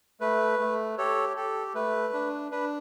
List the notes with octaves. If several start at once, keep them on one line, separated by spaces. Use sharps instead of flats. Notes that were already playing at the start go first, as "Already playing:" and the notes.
A3 B4
A3
G4 A4 C#5
G4 A4
A3 B4
D4
D4 B4